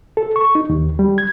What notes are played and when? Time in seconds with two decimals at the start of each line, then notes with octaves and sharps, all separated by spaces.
0.17 A4
0.36 C#6
0.55 D#4
0.69 D#2
0.99 G3
1.18 G#6